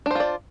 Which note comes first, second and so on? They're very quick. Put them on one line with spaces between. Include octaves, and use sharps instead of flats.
D4 C5 F4 D5